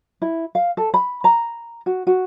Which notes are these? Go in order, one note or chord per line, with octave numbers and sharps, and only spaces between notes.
E4
F5
A4
B5
A#5
F#4
F#4